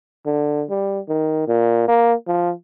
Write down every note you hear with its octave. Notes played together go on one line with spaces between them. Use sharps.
D3
G3
D#3
A#2
A#3
F3